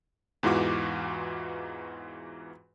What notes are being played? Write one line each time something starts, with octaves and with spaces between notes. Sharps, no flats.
E2 G#2 E3 F4 F#4 D6